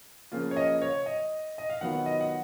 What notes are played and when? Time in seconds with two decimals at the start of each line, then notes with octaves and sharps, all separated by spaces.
0.32 C#3 F3 A#3 F4
0.51 C#5
0.57 D#5
0.82 C#5
1.06 D#5
1.58 D#5
1.70 F5
1.81 D#3 F#3 B3 F4 F#5
2.06 D#5
2.21 F#5